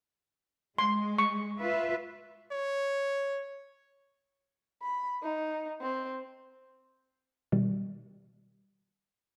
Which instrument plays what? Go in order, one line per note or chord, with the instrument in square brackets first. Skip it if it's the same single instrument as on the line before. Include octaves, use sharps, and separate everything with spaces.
[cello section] G#3 [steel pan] C6
[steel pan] C#6
[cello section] F4 B4 E5
[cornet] C#5
[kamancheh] B5
D#4
C4
[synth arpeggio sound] B2 D#3 G3